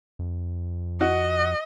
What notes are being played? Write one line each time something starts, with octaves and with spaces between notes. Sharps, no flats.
F2
F#4 D#5